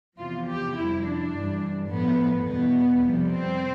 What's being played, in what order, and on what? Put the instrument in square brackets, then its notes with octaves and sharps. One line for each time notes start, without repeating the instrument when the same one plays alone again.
[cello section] E2 C3 F3 F4
G4
F2 C3 G3 E4
D4
G2 E3 G3
A2 F3 B3
E2 B2 G3 B3
F2 C3 G3
C4